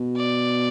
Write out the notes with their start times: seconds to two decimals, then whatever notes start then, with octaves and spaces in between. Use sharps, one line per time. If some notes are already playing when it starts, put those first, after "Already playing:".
Already playing: B2
0.17 D5